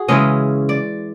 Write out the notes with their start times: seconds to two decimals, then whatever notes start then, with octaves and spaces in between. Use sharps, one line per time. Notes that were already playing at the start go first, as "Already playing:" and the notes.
Already playing: F#4 G#4
0.08 C#3 E3 G#3 C#4 D#5
0.69 D5